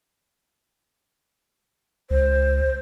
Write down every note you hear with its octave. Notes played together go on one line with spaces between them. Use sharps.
C#2 C5